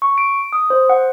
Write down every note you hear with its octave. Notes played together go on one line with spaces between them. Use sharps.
C#6
D7
D#6
C5
F#5